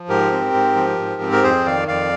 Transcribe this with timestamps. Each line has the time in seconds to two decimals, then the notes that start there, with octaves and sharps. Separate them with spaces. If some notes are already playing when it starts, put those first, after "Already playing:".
Already playing: F3
0.09 G#2 G4 A#4
0.32 C4
0.54 G#2
0.76 F3
0.98 G#2
1.22 C4
1.32 A#4
1.43 F2 G#4 C5
1.66 D#3 D5 F5
1.88 F2 D5 F5